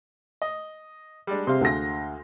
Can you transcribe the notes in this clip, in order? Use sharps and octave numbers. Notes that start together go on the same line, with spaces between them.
D#5
G3 G#3 D4
C3 G#3 F5 C6
D2 A#6